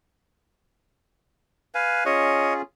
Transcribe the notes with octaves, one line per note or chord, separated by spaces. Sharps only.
B4 F5 G#5
C#4 F4 G#4 C#5 D#5